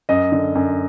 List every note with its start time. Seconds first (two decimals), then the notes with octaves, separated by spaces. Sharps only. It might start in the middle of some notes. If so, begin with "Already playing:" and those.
0.09 F#2 D#5
0.32 D3
0.55 F#2